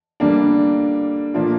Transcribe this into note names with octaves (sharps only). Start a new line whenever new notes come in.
D3 G3 A#3 D4
A#2 F3 A#3 D4 F4